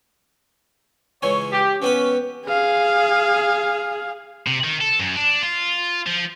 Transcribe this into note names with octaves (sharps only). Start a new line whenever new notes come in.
C#2 E3 C#5 G#5
G4
E3 B3 C#4 B4
G#4 F5
C3
D#3
A4
F#2
D4
F4
F3